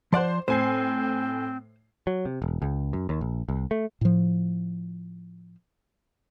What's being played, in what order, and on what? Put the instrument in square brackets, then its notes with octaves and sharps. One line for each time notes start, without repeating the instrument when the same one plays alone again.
[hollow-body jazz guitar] F3 D5 F#5 [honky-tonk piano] C5 C6
[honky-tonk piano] A2 G#5 C7 [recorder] C4 [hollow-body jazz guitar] C5
[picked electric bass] F#3
C3
E1
C#2
F#2
D#2
A#1
C2
A3
[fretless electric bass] A2 F3